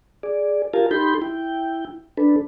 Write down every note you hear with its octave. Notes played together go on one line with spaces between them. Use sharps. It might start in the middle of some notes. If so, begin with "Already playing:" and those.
G#4 D5
F4 G4 A#4 F5 G#5 A5
D#4 G4 A4 B5 C6 G6
E4 G5
D4 A4 B4